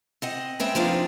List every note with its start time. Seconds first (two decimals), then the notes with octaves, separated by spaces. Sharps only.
0.22 C4 D#5 F#5
0.60 C#3 G#3 C4 B4 E5 G5
0.75 F3 G#3 C4 D4 D#4 F4